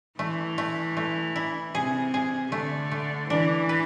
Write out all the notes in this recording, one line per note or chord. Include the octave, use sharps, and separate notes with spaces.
E3 A3
A3
A3
E4
C3 G#4
G#4
D3 A3
A3
E3 D4
B4